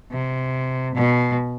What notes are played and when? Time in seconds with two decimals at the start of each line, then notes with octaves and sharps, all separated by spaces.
0.11 C3
0.95 B2